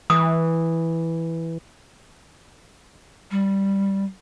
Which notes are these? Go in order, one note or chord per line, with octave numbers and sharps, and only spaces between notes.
E3 D#6
G3